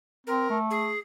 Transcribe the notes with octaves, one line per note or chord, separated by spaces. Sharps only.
C4 A#4
A3
G#4